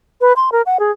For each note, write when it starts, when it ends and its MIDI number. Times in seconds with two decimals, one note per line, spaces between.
0.21 0.33 71
0.36 0.49 84
0.52 0.62 70
0.66 0.77 78
0.79 0.91 68